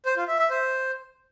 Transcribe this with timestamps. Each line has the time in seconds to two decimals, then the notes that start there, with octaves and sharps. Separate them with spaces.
0.06 C5
0.17 F4
0.28 E5
0.39 E5
0.50 C5